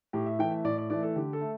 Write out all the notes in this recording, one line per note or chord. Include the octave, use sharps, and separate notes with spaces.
A2 G4
E5
E3 A3 G5
E5
A2 D5
D5
E3 A3 D5
A4
D3 G4
A4
A3